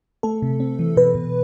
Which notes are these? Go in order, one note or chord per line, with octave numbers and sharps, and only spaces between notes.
A3 A4
C3
C4
E3
B2 B4
B2